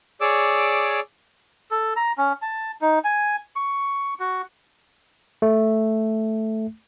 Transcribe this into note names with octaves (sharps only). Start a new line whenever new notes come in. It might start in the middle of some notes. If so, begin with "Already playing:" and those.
G#4 C#5 D5 D6 E6
A4
A#5
C#4
A5
D#4
G#5
C#6
F#4
A3